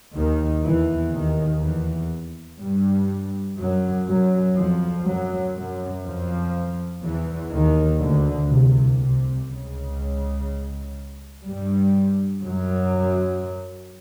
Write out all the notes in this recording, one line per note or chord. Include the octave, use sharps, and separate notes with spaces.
D#2 D#3
E2 E3
D#2 D#3
E2 E3
G2 G3
F#2 F#3
F#2 F#3
F2 F3
F#2 F#3
F#2 F#3
F2 F3
E2 E3
D#2 D#3
D2 D3
C2 C3
C2 C3
C#2 C#3
G2 G3
F#2 F#3